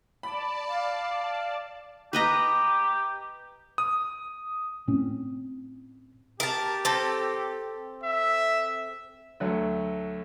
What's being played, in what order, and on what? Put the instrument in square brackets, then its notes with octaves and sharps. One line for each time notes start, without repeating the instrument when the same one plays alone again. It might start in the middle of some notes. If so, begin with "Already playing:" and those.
[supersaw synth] D5 A5 [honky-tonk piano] B5
[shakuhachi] F5
[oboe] G4 [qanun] B4 D#5 A#5
[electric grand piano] D#6
[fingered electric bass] A2 C4 C#4
[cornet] G4 [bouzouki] A#4 A5
[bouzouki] C4 A4
[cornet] E5
[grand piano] D2 F#3 A3